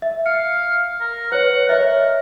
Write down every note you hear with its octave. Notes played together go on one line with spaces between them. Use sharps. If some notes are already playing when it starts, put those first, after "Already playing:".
E5
F5 C#7
A#4
B4 C#5 F#5
A#4 C#5 D#5 E5